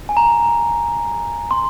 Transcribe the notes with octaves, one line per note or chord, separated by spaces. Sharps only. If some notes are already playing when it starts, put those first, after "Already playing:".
G#5
A#5
C6